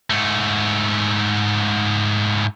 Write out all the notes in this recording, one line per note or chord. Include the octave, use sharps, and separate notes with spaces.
G#2 A3